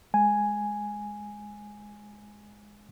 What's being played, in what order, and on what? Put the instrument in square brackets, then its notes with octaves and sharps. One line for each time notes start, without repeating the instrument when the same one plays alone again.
[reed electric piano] G#3 G#5